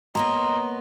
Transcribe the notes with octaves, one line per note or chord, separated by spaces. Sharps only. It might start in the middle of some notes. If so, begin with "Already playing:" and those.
A#3 B3 C#5 D#5 A#5 C6